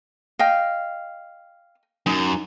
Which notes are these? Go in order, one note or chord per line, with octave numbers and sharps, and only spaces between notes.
D#5 F5 G5
F#2 D#4